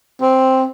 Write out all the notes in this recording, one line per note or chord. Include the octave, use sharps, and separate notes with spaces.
C4